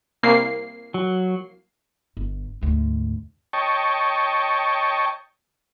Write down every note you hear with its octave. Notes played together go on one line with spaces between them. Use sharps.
C2 A#3 C7
F#3
G1
D2 G#2
C#5 D#5 G5 A5 C#6